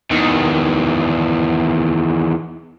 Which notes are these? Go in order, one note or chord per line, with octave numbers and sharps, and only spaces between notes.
E2 D#3